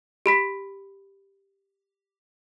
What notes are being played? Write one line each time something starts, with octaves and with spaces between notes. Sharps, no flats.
G4 B5 B6